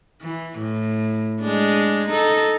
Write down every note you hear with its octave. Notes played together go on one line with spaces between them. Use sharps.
E3
A2
G#3 D4
D#4 A4